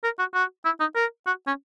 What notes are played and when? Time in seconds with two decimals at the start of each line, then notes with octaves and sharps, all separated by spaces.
0.04 A#4
0.19 F#4
0.34 F#4
0.65 E4
0.80 D#4
0.95 A#4
1.26 F#4
1.47 C#4